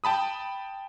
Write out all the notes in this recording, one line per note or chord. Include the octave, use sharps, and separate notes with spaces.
G5 A5 B5 D#6